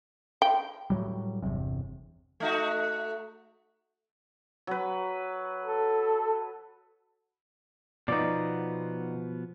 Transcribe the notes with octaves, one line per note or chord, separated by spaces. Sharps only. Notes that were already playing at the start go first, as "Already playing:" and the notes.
G5
A2 F#3 G3
G1 E2 C3
A3 D#4 F#4
F#3 B4
A4
B2 F3 B3 D#4 D5